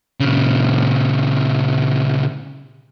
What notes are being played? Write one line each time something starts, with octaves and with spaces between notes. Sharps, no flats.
A#2 C#3